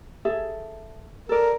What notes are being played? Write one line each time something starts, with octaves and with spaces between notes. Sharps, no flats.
G#4 A4 E5
A4 A#4 D5